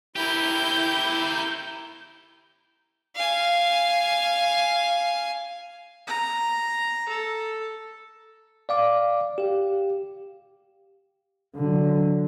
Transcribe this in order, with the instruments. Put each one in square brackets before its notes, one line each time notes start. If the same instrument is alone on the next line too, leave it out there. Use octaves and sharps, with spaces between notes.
[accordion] E4 [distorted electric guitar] G4 A#4 [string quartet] G6
[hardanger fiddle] F5 G#5
[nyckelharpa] A#5
A4
[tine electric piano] D5 F5 D6
G4 F5
[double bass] D3 F#3